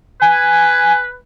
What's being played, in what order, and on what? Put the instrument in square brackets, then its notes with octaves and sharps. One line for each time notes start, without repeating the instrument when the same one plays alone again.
[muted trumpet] B4 [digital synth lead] G#5